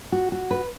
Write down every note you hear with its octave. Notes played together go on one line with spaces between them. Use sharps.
F#4
F#4
B4